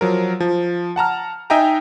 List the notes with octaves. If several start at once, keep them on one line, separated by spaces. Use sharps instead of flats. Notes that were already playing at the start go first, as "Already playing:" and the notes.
F3 F#3 A#4
F3
F#5 A5 A#5 F6
D#4 D#5 E5 G5 G#5 A#5